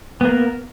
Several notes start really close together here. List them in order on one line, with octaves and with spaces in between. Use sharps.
B3 A#3 A#4